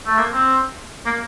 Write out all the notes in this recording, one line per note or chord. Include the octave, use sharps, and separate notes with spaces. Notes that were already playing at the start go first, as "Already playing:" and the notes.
A3
A#3
C4
A#3